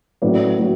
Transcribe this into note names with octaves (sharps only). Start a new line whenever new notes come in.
A1 A2 F#3 B4 D5
A2 F#3